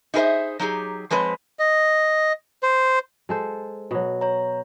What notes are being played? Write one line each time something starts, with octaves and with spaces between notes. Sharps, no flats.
D#4 E4 G#4 A#4 C5 E5
F#3 D#4 G4 G#4
F3 G#3 C4 B4 C#5
D#5
C5
G#3 A4 C5
B2 F#3
C#5 A#5